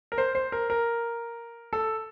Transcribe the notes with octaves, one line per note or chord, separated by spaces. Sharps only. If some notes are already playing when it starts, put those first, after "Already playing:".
A#4
C5
C5
A#4
A#4
A4